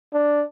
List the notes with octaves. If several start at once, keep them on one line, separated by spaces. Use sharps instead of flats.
D4